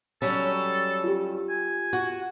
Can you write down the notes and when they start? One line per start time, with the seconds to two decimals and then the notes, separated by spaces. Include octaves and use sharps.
0.22 F#3 G3 C#4 A4
1.04 F4 G4
1.50 G#5
1.93 F#4